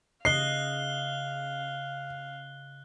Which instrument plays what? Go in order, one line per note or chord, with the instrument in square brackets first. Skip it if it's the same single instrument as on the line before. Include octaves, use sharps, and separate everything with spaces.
[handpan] C#3 D#5 [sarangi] F5 [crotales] F#6 G7 [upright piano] C7